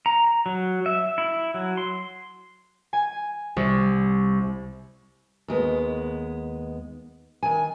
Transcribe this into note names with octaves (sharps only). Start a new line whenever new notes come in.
A#5
F#3
E5
E4
F#3
C6
G#5
C2
D#2 G#3 B3
D#3 G#5